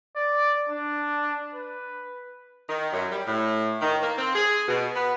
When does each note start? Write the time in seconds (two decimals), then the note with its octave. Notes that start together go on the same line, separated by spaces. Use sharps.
0.16 D5
0.69 D4
1.54 B4
2.69 D#3
2.92 F#2
3.12 G3
3.27 A2
3.81 D#3
4.02 A#3
4.18 C4
4.35 G#4
4.68 B2
4.95 B3